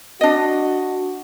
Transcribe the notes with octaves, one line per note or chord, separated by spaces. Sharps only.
D4 F#4 D#5